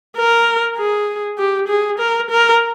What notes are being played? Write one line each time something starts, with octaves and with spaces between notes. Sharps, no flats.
A#4
G#4
G4
G#4
A#4
A#4